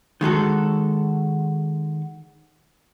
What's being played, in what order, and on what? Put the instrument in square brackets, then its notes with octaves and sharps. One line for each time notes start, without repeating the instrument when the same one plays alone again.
[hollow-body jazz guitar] D#3 G#3 F#4 A4